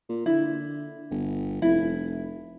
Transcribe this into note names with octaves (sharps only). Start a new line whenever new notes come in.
A#2
D3 E4
G1
F1 E4